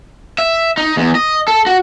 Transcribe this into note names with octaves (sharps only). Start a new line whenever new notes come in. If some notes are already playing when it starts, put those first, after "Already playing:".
E5
D#4
E2
D#5
A4
F#4